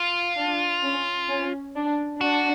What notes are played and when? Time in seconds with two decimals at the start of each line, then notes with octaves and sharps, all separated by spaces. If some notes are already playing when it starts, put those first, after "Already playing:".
Already playing: F4
0.37 D4
0.83 C#4
1.30 C#4
1.76 D4
2.21 D4 F#4